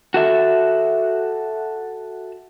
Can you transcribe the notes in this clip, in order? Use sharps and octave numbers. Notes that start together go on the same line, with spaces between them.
F#4 A4 E5